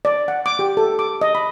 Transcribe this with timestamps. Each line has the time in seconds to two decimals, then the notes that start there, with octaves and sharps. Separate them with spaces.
0.05 D5
0.28 F#5
0.46 D6
0.59 G4
0.77 A4
0.99 D6
1.21 D#5
1.35 B5